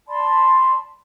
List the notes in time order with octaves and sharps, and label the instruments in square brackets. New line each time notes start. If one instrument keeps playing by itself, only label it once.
[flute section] D5 A5 B5 C6